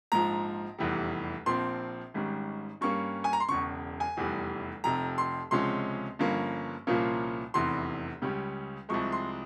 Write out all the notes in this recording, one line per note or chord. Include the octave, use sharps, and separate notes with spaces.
A#1 G#2 F3 A#5
F1 E2 E3 G3
A#1 A#2 F3 C4 C6
G#1 G#2 G3 C#4
G2 G3 A#3 C#4 C#6
G#5
A#5
C6
E1 E2 C#3 C#6
G#5
F1 E2 E3 G3
F1 F2 C3 A#5
C6
C#2 C3 F3 G#3 C#4 C6
G1 G2 F3 A#3 C#4
C2 A#2 F3 A#3 C#4
F1 E2 C3 E3 C6
C#2 C#3 G3 C#4
C2 C3 F3 G#3 C#6
C6